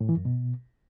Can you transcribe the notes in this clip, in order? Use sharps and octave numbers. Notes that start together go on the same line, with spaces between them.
A2
E3
F#2
B2